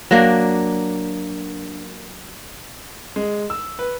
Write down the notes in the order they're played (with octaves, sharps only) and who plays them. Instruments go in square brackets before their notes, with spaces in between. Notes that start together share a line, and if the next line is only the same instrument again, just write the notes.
[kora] F#3 A#3 D4
[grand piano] G#3
E6
B4